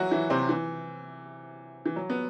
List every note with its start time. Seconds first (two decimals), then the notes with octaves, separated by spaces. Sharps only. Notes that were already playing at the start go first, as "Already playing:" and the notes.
Already playing: E3 F#3 E4 F#4
0.11 E3 E4
0.30 C3 C4
0.49 E3
1.86 E3
1.96 F#3
2.10 B3